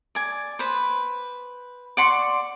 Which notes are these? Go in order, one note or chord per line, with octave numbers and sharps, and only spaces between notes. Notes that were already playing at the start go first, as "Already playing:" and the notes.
D5 G#5
B4 C5
D5 F#5 C6 C#6